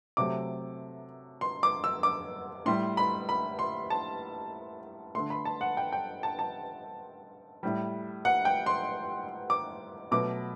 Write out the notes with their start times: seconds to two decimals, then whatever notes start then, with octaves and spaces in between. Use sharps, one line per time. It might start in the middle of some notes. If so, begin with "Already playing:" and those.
0.17 C3 F#3 A3 D6
1.41 C6
1.63 D6
1.84 E6
2.03 D6
2.66 A2 G3 C6
2.97 B5
3.29 B5
3.59 C6
3.90 A5
5.15 D3 A3 C6
5.30 B5
5.45 A5
5.61 F#5
5.77 G5
5.92 G5
6.23 A5
6.39 A5
7.63 A2 G3
8.25 F#5
8.45 G5
8.66 C6
9.50 D6
10.12 B2 F#3 A3 D6